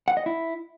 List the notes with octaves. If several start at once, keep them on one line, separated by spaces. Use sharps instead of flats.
F#5
D#5
E4